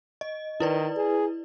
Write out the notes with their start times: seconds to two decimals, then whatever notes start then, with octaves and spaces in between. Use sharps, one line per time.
0.21 D#5
0.60 D#3 E4 B4 D5
0.96 G#4